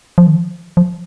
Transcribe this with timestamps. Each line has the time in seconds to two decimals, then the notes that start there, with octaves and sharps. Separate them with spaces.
0.18 F3
0.27 D#3
0.36 F3
0.77 F3